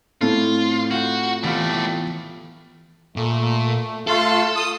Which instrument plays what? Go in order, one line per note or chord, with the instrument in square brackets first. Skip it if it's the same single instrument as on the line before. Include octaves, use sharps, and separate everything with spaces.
[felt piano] A2 C4 [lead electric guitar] F4 [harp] A4
[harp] F4 G5 [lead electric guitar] F#4
[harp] E3 B3 F4 [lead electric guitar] A3 G4
[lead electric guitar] A#2 [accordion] A3
[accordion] A3 F4 F5 [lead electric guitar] A4
[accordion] D#6